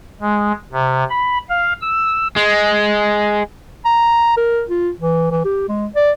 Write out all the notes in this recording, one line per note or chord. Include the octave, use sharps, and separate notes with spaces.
G#3
C3
B5
F5
E6
G#3
A#5
A#4
F4
E3
E3
G4
G#3
D5